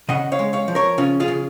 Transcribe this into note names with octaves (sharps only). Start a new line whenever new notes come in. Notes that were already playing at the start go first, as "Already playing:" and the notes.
C#3 D#5 F#5
C#5 F5
G#3
C#5 F5
F3
A#4 C#5
C#3 C#4 F4
F4 G#4
C#3